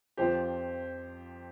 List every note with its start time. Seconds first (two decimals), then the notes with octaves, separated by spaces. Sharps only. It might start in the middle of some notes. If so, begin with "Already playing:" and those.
0.17 F2 F3 G4 C5